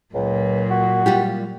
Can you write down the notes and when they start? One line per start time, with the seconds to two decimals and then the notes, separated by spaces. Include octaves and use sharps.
0.14 C#2 A#2 F#3
0.70 F#4
1.06 G3 F4 G4